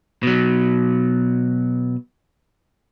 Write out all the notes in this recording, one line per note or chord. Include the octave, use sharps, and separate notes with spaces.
B2 F#3